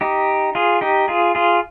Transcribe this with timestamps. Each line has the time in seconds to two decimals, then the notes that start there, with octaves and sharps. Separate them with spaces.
0.01 D#4 G4
0.55 F4 G#4
0.81 D#4 G4
1.08 F4 G#4
1.35 F4 G#4